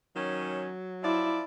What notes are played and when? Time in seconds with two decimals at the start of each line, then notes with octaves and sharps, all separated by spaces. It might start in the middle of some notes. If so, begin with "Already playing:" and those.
0.16 D#3 F#3 C#4
1.04 F3 E4 D5